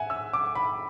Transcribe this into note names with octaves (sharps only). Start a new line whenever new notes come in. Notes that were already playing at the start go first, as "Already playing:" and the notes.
Already playing: E5 F#5 G#5
E6
D6
B5